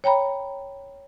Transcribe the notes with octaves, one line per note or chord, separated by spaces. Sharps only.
C#5 G5 A#5 B5